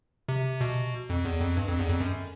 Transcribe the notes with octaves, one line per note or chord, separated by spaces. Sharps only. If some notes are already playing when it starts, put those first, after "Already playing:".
C3
B2
F2
E2
F2
G2
F2
E2
F2
F#2